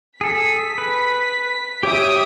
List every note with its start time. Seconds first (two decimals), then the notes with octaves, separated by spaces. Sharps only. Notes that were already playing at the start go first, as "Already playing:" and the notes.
0.21 G#4 A4 B6
0.78 B4
1.83 G4 C#5 E5 D6 D#6 D7